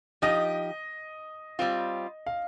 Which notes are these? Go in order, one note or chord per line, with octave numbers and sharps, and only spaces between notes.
F3 D#4 G4 D#5
G3 C4 F4
F5